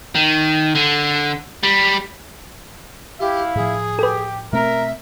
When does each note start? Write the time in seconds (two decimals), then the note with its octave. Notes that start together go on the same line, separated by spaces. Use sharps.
0.15 D#3
0.75 D3
1.63 G3
3.19 E4 G4 E5 F5
3.55 A2 F3 G#4
3.99 G4 A4 B4
4.53 B2 A3 C4 A#4 E5